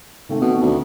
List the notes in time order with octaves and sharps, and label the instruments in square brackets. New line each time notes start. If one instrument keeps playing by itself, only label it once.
[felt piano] D#3 A3 C4
[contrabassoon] B2
D2